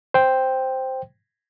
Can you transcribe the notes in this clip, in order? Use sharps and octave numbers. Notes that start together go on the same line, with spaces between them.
C5 G5